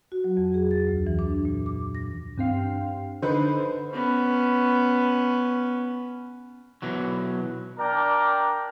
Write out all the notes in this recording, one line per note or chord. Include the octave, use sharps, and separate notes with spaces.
F#4
F#3
F2
G#4
A6
D2
E3
D4
A#2
D6
A#6
G2 C4 F5
D3 D#4 B4 C5
B3 C#4
B2 E3 F#3
D4 A#4 D5 G5 A#5